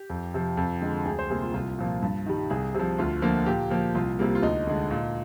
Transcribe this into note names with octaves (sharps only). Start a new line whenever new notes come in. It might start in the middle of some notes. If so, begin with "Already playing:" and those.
Already playing: G4
F2
C3 F3
F2
D3 G#3
D2 G#4
C5
C3 G3 A#3 G#4
F4
C2 F4
A#2 F3 A#3
G2
D#3 G3
C2 G#4
C3 F3
D2 F4
D3 F3 A#3
A#2 G4
F3 A#3
C2 F4
C3 G3 A#3
F4
D2 D#4
D3 G#3
A#2